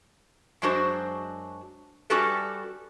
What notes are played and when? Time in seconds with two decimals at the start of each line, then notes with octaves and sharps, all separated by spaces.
0.62 F#2 F#3 G#3 D4 F#4 C5
2.10 G3 C#4 F#4 G4 A4 B4